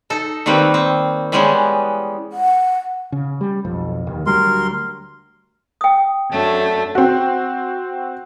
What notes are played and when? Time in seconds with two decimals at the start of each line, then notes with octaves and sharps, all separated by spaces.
0.10 D#4 A4
0.46 D#3 G3 A#3 C4 B4
0.74 C4
1.32 E3 G3 G#3 B3 C#4
2.32 F#5
3.12 C#3
3.41 G3
3.65 B1 F2
4.07 D#2 D#3
4.26 D2 F#3 G3 A#4 C6
5.81 G5 D#6
6.29 F#2 A3 D4
6.95 C4 F#4